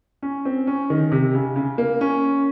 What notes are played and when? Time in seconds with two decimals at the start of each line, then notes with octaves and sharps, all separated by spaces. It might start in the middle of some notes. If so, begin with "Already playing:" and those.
0.22 C#4
0.45 C4
0.67 C#4
0.90 D#3
1.12 C3
1.35 C#3
1.56 C#3
1.78 A#3
2.01 C#4